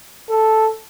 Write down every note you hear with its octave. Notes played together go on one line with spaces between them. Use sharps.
A4